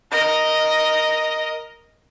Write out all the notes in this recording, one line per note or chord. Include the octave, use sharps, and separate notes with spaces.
A#4 D#5